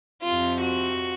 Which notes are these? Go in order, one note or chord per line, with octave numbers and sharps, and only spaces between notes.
F2 C3 F3 F4
F#4